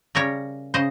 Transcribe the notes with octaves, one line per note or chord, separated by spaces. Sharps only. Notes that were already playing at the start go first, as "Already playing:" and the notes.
C#3 G3 A#4 C#5
C#3 C5 D#5